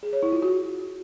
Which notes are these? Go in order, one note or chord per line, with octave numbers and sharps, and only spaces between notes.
G#4
C#5
E4
F4
F#4